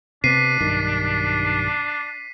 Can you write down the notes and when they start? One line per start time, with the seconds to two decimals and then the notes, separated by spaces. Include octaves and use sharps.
0.24 C3 B3 D4 B6 C7 D#7
0.61 B1 G2 D#3